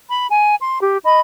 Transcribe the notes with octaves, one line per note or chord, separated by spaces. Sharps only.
B5
G#5
C6
G4
D#5 B5